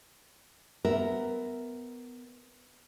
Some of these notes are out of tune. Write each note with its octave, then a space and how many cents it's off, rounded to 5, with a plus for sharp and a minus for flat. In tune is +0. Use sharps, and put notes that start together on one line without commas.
B3 +15 A#4 +0 E5 +0